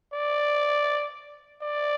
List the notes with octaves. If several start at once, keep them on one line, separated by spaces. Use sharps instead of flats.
D5
D5